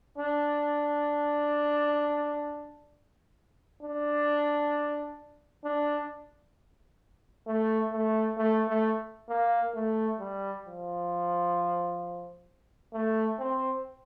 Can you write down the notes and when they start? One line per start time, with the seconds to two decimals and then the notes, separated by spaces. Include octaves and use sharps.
0.18 D4
3.83 D4
5.65 D4
7.47 A3
7.92 A3
8.38 A3
8.68 A3
9.29 A#3
9.75 A3
10.20 G3
10.66 F3
12.93 A3
13.39 C4